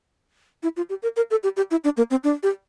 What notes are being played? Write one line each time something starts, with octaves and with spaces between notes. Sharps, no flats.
E4
F4
G4
A#4
A#4
A4
G4
G4
E4
D4
A#3
C4
D4
G4